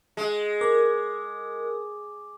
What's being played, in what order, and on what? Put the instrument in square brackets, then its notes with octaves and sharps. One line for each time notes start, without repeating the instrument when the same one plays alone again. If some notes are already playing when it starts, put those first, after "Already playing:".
[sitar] G#3
[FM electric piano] A#4 [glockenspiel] D6